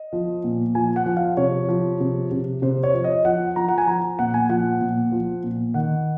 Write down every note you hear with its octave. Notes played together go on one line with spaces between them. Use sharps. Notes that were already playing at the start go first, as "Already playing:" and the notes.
Already playing: D#5
F3
A#2
F3 G#5
F#5
F3
F5
C3 C#5
F3
C3
C3
C3 C5
C#5
F3
D#5
F3 F#5
F3 A#5
F#5
G#5
F3 A#5
A#2 F#5
G#5
F3 F#5
A#2
F3
A#2
D#3 F#5